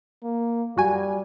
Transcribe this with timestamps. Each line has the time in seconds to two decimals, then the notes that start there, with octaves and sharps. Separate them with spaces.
0.23 A#3
0.77 F#2 G3 F#4 G#5